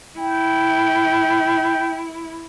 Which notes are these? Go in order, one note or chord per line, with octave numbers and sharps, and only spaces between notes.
E4 G5